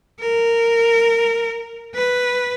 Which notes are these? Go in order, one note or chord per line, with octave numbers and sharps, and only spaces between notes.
A#4
B4